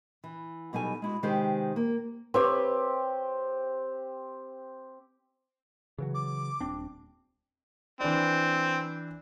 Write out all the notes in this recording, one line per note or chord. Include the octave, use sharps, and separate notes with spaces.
E3
B2 F#3 G3 D#4 A4 G#5
G#3 E4 F#4
C3 D#3 G#3 G4 B4 C5
A#3
C4 G4 B4 C#5
C#3 E3 F#3
D6
D#1 C4 D4
E3 C4 D4